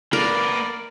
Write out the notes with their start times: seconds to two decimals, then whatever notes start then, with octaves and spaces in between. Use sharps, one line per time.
0.13 A#3 A#4 B4 D5